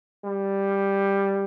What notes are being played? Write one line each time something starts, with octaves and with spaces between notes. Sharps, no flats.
G3